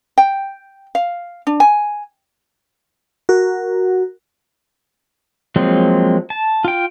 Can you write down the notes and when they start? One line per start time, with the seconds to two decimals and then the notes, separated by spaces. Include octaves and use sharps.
0.18 G5
0.95 F5
1.47 D4
1.60 G#5
3.29 F#4 A#4
5.56 F3 F#3 G#3 A#3 C4
6.30 A5
6.65 F4 G5